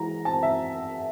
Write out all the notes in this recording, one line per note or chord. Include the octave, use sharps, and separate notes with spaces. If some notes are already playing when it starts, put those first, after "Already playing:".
Already playing: E3 G#3 A#5
C4 A5
E5